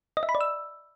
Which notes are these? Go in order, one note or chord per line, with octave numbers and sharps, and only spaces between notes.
D#5
E5
B5
D5
E6